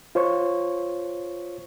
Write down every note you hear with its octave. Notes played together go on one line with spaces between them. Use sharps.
F4 C5 C#5 C#6